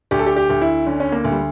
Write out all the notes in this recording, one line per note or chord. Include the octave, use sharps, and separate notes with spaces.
D2 G4
A4
G4
G4
D2
E4
D3 C#4
C#4
A#3
D2
G3